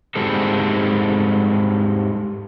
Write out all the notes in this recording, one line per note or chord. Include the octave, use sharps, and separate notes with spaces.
G#2 G3 C4 G#4 A4